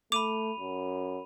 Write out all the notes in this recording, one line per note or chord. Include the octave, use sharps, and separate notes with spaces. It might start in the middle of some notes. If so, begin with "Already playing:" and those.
A3 B5 D6 D#7 F7
F#2